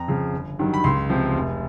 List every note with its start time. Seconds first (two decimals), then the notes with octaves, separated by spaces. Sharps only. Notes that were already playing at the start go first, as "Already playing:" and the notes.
Already playing: F2 A#5
0.08 C#3 F3
0.33 G1
0.59 G2 D#3 F#3
0.74 B5
0.84 C#2 C6
1.09 C3 F3
1.34 F1